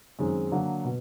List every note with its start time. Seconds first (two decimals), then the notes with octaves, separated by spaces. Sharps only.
0.19 F#2 D#3 G#3 C4
0.52 D3 F#3 A#3
0.85 B2